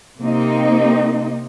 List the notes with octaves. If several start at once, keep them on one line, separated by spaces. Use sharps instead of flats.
C3 A#3 C4 D#4